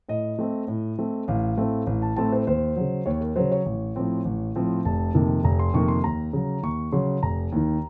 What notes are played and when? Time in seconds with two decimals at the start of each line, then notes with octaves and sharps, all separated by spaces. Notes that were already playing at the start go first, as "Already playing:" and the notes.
0.09 A2 D#5
0.39 A3 C4
0.68 A2
0.99 A3 C4
1.28 A1 F5
1.58 A2 A3 C4
1.87 A1
2.02 A5
2.16 A2 A3 C4 A5
2.32 C5
2.47 D#2 C5
2.76 C#3 F#3
3.06 D#2 C#5
3.21 A#4
3.36 C#3 F#3 C5
3.52 C#5
3.66 A1
3.96 A2 F3 C4
4.25 A1
4.56 A2 F3 C4
4.85 F1 A5
5.14 F2 C3 D#3 A#3
5.44 F1 A#5
5.59 C6
5.74 F2 C3 D#3 A#3 C#6
5.88 C6
6.04 D#2 A#5
6.33 C#3 F#3
6.63 D#2 C#6
6.92 C#3 F#3 C6
7.23 F1 A#5
7.52 D#2 D#3